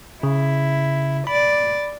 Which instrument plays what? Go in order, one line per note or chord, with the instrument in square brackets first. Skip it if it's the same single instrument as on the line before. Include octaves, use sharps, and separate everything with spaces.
[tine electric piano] C#3 [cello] E4
[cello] D5 [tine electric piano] B5